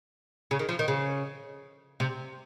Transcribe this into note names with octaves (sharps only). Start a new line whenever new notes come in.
C#3
D#3
F3
D#3
C#3
C3